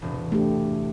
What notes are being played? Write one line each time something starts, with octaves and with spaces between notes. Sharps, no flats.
E1 A2 C3
A3 D4 G4